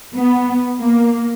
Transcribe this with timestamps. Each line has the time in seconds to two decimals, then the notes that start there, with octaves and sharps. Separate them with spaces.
0.14 B3
0.81 A#3